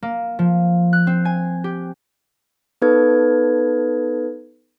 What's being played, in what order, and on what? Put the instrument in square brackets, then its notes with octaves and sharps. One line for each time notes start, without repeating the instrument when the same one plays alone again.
[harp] A#3
F3
F#6
C4
G#5
G4
[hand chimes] B3 D#4 A4 B4 G#6